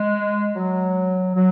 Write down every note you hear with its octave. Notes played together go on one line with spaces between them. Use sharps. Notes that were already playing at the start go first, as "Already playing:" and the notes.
Already playing: G#3
F#3
F#3